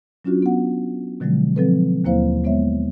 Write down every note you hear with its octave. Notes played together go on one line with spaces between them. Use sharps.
F#3 C#4 D4 F4 F#4
B3 F#5
B2 D3 F3 F#3 G#3
F3 F#3 C4 A4 B4
D#2 F#3 A#3 E4 C5 F5
G#3 B3 C#5 E5